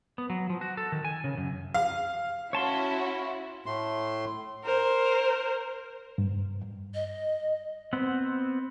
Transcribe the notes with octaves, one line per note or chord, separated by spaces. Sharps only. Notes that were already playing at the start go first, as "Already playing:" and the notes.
B3
F#3
F3
F#4
A4
D#3
G#5
C#3
F#2
F5
C#4 E4 F#4 C#5 A5 C6
A2 A3 C6
A#4 C5
G2
D#5
B3 C4 F#5